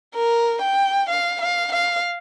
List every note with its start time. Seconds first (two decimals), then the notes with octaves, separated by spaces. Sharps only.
0.15 A#4
0.61 G5
1.09 F5
1.41 F5
1.72 F5